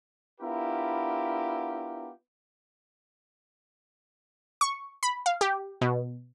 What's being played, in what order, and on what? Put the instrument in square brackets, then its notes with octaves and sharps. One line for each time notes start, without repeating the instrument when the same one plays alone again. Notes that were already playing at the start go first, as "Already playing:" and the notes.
[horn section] B3 D4 E4 F4 G4 A#4
[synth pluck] C#6
B5
F5
G4
B2